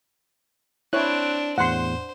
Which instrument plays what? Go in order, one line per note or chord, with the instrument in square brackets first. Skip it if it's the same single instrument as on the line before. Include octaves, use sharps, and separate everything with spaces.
[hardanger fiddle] C4 D4 [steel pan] E4 C#5 [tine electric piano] F#6
[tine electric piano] E2 A2 [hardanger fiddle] C5 [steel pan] F#5 C6